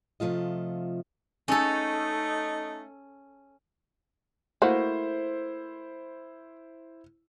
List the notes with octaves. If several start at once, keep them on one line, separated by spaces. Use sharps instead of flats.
C3 F3 A3 F4 D#5
A3 C#4 D#4 A4
A3 A#3 E4 F#4 C5